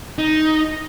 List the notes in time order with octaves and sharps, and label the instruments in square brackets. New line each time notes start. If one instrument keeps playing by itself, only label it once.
[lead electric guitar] D#4